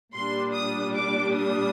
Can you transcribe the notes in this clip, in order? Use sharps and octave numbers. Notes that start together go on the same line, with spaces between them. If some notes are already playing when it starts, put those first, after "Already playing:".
A#2 G3 D4 C6
D#6
D6
D#6